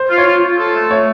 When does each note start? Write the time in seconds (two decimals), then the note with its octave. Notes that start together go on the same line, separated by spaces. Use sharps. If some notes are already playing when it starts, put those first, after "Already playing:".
Already playing: C5
0.09 F4
0.18 C#5
0.26 F4
0.41 F4
0.58 A4
0.74 A3
0.90 A3 C#5